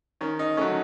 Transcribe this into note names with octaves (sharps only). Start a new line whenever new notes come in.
D#3 C#4
D#4
F#3 A3 C#4